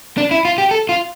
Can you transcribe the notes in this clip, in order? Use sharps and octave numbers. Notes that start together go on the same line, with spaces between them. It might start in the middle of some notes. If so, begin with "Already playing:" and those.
D4
E4
F4
G4
A4
F4